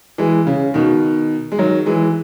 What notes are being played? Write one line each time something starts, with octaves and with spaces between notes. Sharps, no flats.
E3 G#3
C#3
B2 D#3
G#3
D#3 F#3
E3 G#3